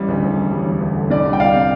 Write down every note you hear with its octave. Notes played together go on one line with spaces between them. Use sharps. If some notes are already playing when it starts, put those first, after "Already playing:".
Already playing: A1 G3
D2
E1
E1
G3
E1
D2
D3
C2 D5
G3
G5
G3 D5 F5
C3